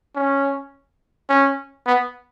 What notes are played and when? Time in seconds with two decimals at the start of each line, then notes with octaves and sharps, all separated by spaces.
0.16 C#4
1.29 C#4
1.86 B3